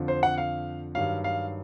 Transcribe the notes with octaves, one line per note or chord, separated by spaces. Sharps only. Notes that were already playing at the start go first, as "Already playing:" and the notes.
Already playing: F2 D3 F3
C5
F#5
F5
G2 D#3 F#3 F5
F5